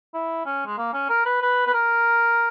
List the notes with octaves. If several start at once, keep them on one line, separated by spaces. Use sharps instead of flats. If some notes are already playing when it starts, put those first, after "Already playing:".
E4
C#4
G#3
A#3
C#4
A#4
B4
B4
B4
A#4